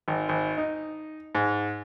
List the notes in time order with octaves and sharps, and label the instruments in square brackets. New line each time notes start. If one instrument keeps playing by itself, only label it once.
[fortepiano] G#1
G#1
D#4
G#2